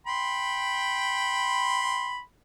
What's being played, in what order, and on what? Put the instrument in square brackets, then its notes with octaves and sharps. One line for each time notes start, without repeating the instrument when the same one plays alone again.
[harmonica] G5 B5 C6